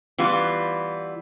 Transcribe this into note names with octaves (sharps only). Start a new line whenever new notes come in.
E3 G3 B3 F4